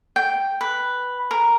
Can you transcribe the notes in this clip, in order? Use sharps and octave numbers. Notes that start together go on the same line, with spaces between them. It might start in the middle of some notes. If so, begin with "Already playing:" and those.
G5
B4
A#4